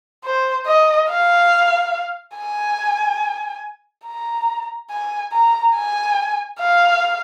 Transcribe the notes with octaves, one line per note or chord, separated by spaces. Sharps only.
C5
D#5
F5
G#5
A#5
G#5
A#5
G#5
F5